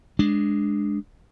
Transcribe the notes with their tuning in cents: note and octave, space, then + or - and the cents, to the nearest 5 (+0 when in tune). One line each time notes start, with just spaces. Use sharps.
G#3 +0 D4 +0